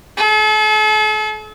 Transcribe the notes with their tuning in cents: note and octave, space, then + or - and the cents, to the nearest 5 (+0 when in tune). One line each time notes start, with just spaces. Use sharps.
A4 -45